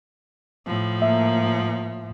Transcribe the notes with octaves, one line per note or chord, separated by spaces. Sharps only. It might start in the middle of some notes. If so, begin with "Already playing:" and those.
A2 F3
A#3 E5